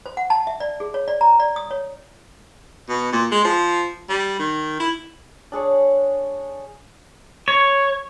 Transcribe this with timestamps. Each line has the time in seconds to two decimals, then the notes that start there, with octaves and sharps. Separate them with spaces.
0.06 C5
0.17 F#5
0.30 A5
0.47 E5
0.60 D5
0.80 G#4
0.94 C#5
1.08 D5
1.21 A#5
1.40 D5
1.56 D#6
1.71 C#5
2.89 B2
3.13 A#2
3.32 G#3
3.45 F3
4.10 G3
4.39 D#3
4.80 E4
5.52 D4 G#4 C#5
7.48 C#5